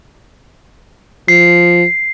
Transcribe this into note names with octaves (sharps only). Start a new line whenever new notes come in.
F3 C7